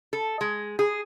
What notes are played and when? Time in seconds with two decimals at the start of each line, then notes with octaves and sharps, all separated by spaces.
0.13 A4
0.41 G#3
0.79 G#4